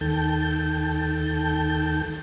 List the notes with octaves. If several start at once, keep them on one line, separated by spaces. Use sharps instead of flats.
D#2 D#3 A4 G5 A5 G6